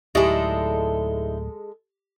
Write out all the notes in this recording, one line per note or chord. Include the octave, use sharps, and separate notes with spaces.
D1 G#3 D#4 E4 G4 A4 D5 G#5